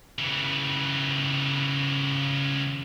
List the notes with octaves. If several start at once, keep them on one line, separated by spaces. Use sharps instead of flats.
C#3 E3